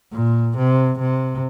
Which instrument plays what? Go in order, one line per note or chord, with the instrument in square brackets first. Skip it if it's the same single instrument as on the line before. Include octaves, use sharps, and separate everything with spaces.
[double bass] A#2
C3
C3